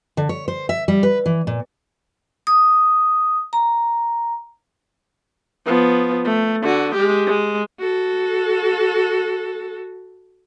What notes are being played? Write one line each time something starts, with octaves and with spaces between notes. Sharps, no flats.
D3
C#5
C5
E5
G3
B4
E3
A#2
D#6
A#5
F3 B3
A3
D3 F#4
G#3 G4
G#3
F#4 A4